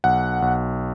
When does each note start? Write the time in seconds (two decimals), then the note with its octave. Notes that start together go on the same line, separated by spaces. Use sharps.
0.04 B1 F#5
0.42 B1